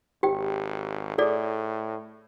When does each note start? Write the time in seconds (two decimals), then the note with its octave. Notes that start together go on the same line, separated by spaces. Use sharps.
0.23 G#1 G4 G5
1.18 A2 G#4 A4 D5